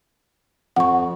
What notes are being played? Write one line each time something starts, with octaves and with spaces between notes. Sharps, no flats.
F2 F#5 C#6